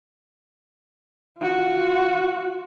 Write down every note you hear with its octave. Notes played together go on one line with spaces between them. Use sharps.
F4 F#4